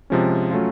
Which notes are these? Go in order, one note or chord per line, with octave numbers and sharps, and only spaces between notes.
C3 F3 G#3 C#4
F#3 A3 C#4 F4